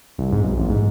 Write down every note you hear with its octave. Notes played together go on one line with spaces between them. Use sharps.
C2
G#2
B1
A1
G#2